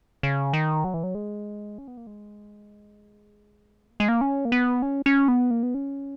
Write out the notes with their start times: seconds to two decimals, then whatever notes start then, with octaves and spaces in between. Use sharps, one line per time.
0.23 C#3
0.53 D#3
0.84 F#3
0.94 E3
1.03 F#3
1.15 G#3
1.78 C#4
1.88 B3
1.97 A#3
2.07 G#3
3.91 A#3
4.00 G#3
4.08 A#3
4.21 C#4
4.45 A#3
4.52 B3
4.82 C#4
5.06 C#4
5.28 B3
5.51 A#3
5.63 B3
5.74 C#4